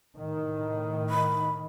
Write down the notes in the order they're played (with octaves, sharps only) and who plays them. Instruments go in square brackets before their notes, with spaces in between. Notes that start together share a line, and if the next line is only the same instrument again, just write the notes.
[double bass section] A2 D#3
[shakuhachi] B5